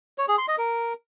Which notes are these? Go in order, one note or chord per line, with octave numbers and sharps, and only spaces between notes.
C#5
G#4
C6
D#5
A#4